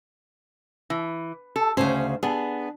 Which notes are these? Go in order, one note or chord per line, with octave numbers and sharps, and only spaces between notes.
E3
A4
D2 C#3 C#4 C5
B3 D4 G#4